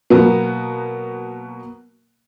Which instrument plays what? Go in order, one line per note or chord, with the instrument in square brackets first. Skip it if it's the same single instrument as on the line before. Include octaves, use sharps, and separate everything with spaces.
[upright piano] B2 F#3 A#3 B3